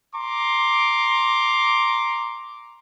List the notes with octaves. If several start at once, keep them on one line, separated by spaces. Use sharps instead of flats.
A#5 C6 D6